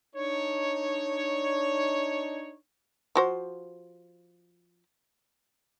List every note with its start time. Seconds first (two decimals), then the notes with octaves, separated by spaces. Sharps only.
0.16 D4 D#4 C#5
3.15 F3 F#4 C5